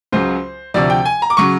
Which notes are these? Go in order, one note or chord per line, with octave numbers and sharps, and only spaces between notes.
C#2 C#3 F#3 C5
D2 C3 F3 D5
G5
G#5
A#5
D6
C#3 F#3 C#6